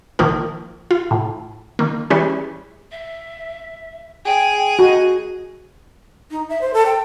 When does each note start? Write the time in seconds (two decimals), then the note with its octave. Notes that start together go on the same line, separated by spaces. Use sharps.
0.19 A#1 D#3 F3 A#3 A#4
0.91 F4
1.11 A2
1.79 D#3 A#3
2.10 E3 G3 G#3 C#4 B4
2.91 E5
4.25 G#4 G5 G#5
4.79 F#4 D#5
6.31 D#4
6.49 E5
6.61 C5
6.74 A4
6.86 G5